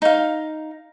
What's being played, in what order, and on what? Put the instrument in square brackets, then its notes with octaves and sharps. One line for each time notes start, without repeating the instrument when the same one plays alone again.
[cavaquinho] D#4 F5